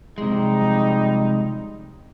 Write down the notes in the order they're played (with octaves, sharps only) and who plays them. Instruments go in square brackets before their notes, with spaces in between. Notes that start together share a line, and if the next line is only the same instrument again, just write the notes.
[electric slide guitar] C3 G#3 [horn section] F3 G3 D#4